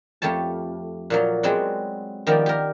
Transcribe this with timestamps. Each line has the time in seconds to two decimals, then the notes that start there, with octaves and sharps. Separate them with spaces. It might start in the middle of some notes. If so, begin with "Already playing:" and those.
0.22 F2 A3 G4 C#5 A5
1.10 A#2 F3 F#3
1.43 F#3 G#3 B3 C4 D5 F#5
2.27 D#3 F3 B3 G4 A#4 D5
2.46 G4 A#4